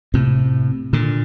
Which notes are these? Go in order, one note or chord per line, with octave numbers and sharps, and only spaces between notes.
A2 C3
A#2 D3